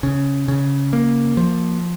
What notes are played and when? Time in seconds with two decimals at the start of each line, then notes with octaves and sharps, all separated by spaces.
0.03 C#3
0.48 C#3
0.93 A#3
1.37 F3